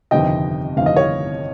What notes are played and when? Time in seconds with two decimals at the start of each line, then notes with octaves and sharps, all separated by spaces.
0.11 G1 F2 C3 D#3 D#5 G5
0.77 G1 F2 C3 D#3 F5
0.86 D#5
0.96 C#5 F5